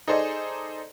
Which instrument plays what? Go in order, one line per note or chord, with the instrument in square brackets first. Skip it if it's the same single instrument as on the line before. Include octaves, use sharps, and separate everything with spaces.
[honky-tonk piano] D#4 G#4 A4 C5 D5 D#5